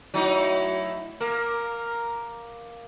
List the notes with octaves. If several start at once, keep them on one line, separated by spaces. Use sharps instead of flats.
F#3 A3 D#4 E4
A#3 A#4